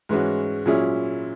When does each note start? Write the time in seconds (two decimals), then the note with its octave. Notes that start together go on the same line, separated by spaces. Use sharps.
0.09 G#2 E3 G#3 C#4 F#4
0.66 A#2 F#3 C#4 E4 G#4